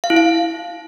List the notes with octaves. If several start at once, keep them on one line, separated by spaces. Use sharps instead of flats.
F5
E4
F5